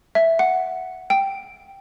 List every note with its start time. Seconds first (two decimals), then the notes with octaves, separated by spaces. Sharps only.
0.15 E5
0.39 F#5
1.10 G5